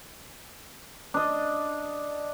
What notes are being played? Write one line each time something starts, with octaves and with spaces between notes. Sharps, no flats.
D4 D#5